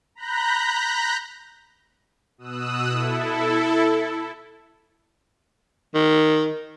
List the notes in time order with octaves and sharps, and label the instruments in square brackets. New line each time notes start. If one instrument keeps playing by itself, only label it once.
[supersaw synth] A#5 B5 F#6 G6 A#6
B2 D#6 E6 F#6
E4 A4
[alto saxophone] D#3